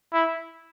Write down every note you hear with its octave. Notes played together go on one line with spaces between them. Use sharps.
E4